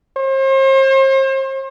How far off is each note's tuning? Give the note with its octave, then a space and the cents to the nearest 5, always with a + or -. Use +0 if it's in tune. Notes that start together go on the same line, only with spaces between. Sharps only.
C5 +40